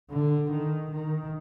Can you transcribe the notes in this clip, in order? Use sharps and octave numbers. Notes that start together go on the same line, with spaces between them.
D3
D#3
D#3